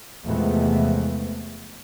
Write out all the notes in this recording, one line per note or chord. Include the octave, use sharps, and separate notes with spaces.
E2 C3 F3 G#3 A3 B3